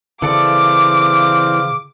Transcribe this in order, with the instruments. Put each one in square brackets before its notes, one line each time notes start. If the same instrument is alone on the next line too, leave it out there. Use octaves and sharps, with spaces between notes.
[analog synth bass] C#3 [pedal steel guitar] E3 A4 D5 [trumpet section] C4 F5 [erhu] D6